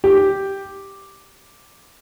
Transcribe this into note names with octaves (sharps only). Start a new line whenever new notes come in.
G4